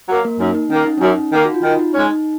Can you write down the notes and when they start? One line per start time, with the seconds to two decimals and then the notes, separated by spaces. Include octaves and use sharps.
0.09 F#3 A#3
0.24 A#3 A#4
0.40 F#2 D#4
0.55 D#4
0.70 D#3 A#3 C#4
0.86 D#4
0.98 C#4
1.01 F#2 D#4
1.33 D#3 A#3
1.45 F#4
1.54 F4
1.63 D#3 D#4
1.79 D#4
1.94 G#3 C#4 D#4
2.11 D#4